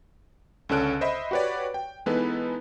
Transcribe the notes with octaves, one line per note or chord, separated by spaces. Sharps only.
C#2 D3 C#4 A4 F#6 D7
C5 D#5 E5 B5
F#4 G4 B4 C#5 D5
G5
E3 G#3 B3 D#4 A4 B4